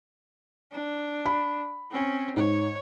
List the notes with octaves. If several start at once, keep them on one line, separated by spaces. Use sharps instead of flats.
D4
B5
C4 C#4
G#2 C#5